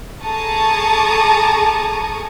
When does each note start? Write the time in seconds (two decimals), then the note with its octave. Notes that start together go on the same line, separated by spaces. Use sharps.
0.25 G#4 A4 A5 A#5 C#6 D#6